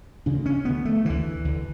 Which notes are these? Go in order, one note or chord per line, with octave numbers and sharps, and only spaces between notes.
D2 C#3 D4
C#4
D2 D3 B3
A3
D2 D3 E3
D2 D3